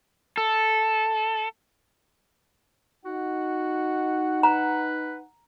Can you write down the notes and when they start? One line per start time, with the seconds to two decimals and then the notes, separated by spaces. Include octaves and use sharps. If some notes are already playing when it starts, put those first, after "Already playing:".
0.37 A4
3.06 D#4 F#4 F#5
4.43 B4 A#5